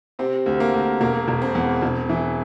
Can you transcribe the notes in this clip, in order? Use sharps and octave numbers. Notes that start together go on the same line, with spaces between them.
C3 C4
D2
A#3
D2
E1 A#3
E1
C4
E2
E1
E3